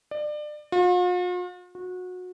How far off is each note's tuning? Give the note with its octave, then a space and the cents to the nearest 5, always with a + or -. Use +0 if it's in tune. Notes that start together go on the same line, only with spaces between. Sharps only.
D5 +30
F4 +45
F#4 -25